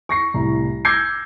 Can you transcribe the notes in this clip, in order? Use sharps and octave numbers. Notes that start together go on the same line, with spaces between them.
C#6 A#6 C7
C2 A2 A#5
D6 E6 G6 G#6 A#6 C7